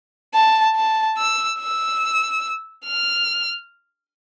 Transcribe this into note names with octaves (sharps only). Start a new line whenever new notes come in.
A5
A5
E6
E6
F6